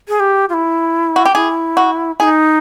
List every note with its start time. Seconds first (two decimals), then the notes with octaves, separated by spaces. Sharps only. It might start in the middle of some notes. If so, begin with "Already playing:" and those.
0.08 G#4
0.20 G4
0.49 F4
0.54 E4
1.16 F#4
1.25 G4
1.35 E4 G#4
1.77 F#4
2.20 E4 G#4
2.23 D#4